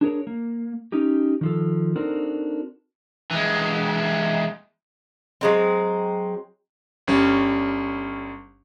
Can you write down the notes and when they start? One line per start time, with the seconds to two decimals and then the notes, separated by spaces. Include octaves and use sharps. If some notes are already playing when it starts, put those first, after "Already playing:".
0.01 D4 G#4 A#4 C#5
0.27 A#3
0.92 C#4 D#4 G4
1.41 D#3 F3 A4
1.96 C4 D4 D#4 F#4 A4 A#4
3.31 E3 G#3
5.41 F#3 G#3 C4
7.07 G1 G3 C#4